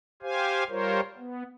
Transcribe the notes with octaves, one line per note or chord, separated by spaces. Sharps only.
G4 C5 F5 G#5
G3 F4 A#4 C5 C#5
B3